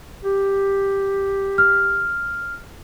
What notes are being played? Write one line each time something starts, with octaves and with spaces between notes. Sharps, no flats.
G4
F6